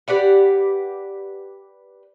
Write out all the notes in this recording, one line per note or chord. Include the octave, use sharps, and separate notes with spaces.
G4 B4 D5 F#5